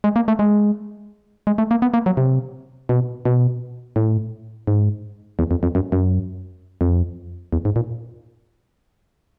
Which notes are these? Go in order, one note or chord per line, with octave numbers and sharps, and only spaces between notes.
G#3
A#3
A3
G#3
G#3
A3
A#3
B3
A#3
F#3
C3
B2
B2
A2
G#2
E2
F2
F2
F#2
F#2
F2
E2
G#2
A#2